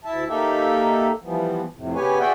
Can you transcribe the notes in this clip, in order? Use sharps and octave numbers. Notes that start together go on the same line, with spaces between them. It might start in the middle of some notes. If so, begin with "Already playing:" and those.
D2 E4 E5 A5
A#3 D#4 G4 A4 E5
E3 F3 G3 B3
F2 A2 C3
C#3 B3 G4 B4 C#5 G#5
F#4 G#4 D5 E5 F#5 G5